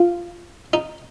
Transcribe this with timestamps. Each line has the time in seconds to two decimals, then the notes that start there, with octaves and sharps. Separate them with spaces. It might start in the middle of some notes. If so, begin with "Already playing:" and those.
Already playing: F4
0.73 D#4